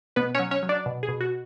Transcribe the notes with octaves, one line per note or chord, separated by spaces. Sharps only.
B2 B3 B4
C#4 C#5
F#3
C#4 C#5
F#3
D4 D5
B2
G#4
B2
F#4